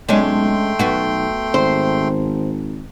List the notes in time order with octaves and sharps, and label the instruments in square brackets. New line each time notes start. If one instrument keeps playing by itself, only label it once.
[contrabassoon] B1 [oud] G#3 C#4 D4 [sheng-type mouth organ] A3 G5 C6
[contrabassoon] B1 [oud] B3 F#4
[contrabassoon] G#1 [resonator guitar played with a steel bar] C5